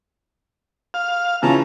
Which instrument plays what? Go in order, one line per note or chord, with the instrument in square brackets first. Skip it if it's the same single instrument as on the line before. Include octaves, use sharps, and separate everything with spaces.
[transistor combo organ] F5
[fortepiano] C#3 E3 [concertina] C#4 A5 A#5 [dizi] F4